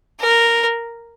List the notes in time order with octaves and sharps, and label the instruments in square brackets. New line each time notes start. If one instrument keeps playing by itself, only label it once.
[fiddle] A#4